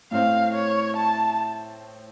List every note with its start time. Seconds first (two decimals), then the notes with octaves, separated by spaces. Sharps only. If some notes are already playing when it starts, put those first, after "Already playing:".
0.11 A2 A3 C4 F5
0.54 C#5
0.97 A5